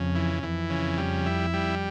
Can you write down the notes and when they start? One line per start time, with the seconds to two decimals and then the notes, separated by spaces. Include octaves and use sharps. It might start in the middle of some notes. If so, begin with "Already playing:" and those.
Already playing: F2 C#3
0.15 E3
0.43 F2 E3
0.70 C#3
0.98 G3
1.26 E4
1.53 G3